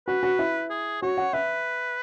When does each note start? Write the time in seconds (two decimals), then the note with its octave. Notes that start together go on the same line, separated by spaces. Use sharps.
0.07 F#4 B4
0.23 F#4
0.39 E4
0.70 G#4
1.02 F#4 C#5
1.17 F#5
1.33 B4 E5